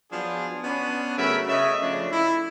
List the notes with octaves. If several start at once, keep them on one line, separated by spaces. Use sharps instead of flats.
F3 F#3 B3 D4 F4 G#4
B3 C#4 D4
C#3 F#3 A3 A#4 E5 B5
C#3 C#5 D#5 E5
C#3 F3 A3 D4
E4